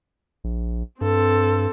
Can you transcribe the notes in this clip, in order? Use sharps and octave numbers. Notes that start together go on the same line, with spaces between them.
A#1
G2 C4 A4